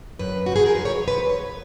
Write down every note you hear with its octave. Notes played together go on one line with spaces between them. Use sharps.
F#2 B4
F#4
F3 G#4
A#4
B4
F3 C#5
B4
F#2
C#5